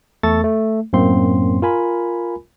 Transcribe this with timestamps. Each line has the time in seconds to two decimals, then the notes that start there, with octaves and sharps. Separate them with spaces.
0.23 E2 A3 A4 C#6 A6
0.44 A3
0.93 F#2 A2 A#3 C4 C6
1.62 F4 A#4 G#5 B5